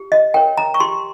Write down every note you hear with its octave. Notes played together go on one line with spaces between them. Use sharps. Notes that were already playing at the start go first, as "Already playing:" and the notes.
Already playing: G4
D#5
A#4 C#5 G5
A#5
C#6
G4 C6